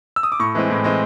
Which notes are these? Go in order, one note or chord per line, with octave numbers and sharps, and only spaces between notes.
E6
D#6
D6
A2 C#6
E3 G#3 C4
A2
E3 G#3 C4